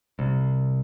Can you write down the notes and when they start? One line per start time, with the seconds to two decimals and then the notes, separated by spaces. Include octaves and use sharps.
0.19 C2